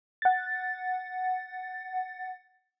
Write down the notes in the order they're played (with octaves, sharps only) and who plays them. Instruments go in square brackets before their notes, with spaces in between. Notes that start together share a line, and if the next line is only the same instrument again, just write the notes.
[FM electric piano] F#5 A6